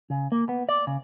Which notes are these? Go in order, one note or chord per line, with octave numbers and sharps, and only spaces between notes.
C#3
A#3
B3
D5
C#3